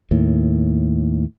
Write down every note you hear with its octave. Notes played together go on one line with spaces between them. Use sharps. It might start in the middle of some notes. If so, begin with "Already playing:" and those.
D#2 A2